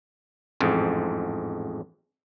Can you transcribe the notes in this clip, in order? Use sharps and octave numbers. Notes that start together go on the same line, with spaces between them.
A1 F2 G#2